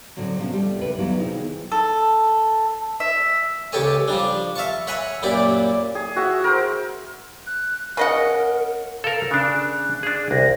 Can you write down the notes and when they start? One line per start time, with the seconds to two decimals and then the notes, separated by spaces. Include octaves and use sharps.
0.17 A2 D3 F#3 C4
0.38 C3 F3 A#3 B3 C#4
0.53 G3 A3
0.77 D#2 C3 A#3 B4
0.98 E3 F#3 G3 B3 E4 F4
1.17 C3 D#3 D#4 E4 G#4
1.72 A4
3.00 E5
3.72 C#2 G4 A4 C#5 G#5
4.08 F3 G3 D4
4.56 E5 F5 A5 C#6
4.87 C#5 E5 F#5 G#5 A#5 B5
5.23 F#2 A#2 E4 G4 D5
5.95 G#4
6.16 F#4 E5 F#5
6.44 A#4 C5
7.46 F#6
7.97 C#3 A#4 D#5 F#5
9.04 A4 A#4 F5
9.31 C#3 D4 F#6
10.03 D4 G#4
10.31 C2 A#6